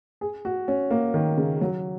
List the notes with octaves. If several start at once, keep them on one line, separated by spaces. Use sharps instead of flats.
G#4
F#4
C#4
A#3
D#3
C#3
F#3